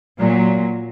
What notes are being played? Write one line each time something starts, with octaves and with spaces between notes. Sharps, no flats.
A#2 F#3